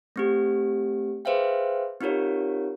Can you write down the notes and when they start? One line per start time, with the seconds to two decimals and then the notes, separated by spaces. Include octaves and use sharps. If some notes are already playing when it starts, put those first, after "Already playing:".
0.16 A3 C4 G4
1.25 G#4 B4 C5 E5 F5 G5
2.01 C4 D#4 F4 G4 A#4 C#5